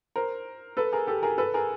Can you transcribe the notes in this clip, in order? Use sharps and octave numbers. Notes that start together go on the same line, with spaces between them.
A#4 C5
A4 B4
G#4 A#4
G4 A4
G#4 A#4
A4 B4
G#4 A#4